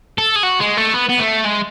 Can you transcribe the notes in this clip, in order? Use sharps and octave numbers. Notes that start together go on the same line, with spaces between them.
A4
G#4
F#4
G#3
A3
B3
B3
A3
G#3